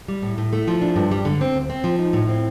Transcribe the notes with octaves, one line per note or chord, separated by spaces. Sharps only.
G3
A2
A2
A3
F3
D4
G2
G3
D3
C4
D2
C4
F3
D#4
A2
C4